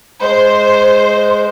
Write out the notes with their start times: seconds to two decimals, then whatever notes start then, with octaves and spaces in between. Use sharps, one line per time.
0.21 G#3 C5